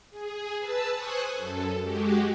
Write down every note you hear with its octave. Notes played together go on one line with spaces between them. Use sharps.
G#4
B4 A5 E6
C5 G#5 C#6 D#6 F#6
F#2 A4
G#3 F#4 G4